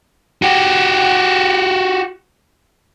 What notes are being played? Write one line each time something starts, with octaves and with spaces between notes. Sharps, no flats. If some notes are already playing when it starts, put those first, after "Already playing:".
F#4 G4